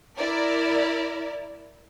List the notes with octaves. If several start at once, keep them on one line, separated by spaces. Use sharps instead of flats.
E4 A#4 D5